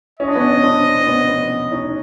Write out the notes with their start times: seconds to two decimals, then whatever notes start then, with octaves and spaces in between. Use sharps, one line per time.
0.20 C#4 D#5
0.28 D4
0.35 B3 C#4
0.55 C#4
0.63 C4 D4
0.99 C4
1.06 B3 C#4
1.28 B3 C#4
1.71 C#4 D#4